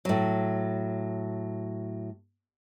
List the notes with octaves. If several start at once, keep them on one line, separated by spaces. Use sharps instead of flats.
A2 F#3